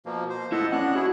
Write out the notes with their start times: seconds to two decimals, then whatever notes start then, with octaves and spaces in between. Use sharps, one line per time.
0.06 B2 F3 A#3
0.30 C5
0.52 A2 E4 A4 D#5 F#5
0.72 B3 C#4 D4 F#5 F#6
0.95 E4 F#4 G#4 C#5